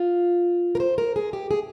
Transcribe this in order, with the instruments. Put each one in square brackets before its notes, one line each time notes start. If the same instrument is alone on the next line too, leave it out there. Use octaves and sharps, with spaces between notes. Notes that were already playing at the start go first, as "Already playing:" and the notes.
Already playing: [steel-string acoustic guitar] F4
A#4
C5
A#4
G#4
G4
G#4